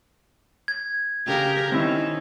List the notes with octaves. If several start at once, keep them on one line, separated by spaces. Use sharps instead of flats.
G#6
C#3 G4 A#4
D#3 C4 C#4 E4